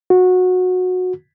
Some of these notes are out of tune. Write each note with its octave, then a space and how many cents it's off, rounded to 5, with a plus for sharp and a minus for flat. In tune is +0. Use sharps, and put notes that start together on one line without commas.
F#4 -15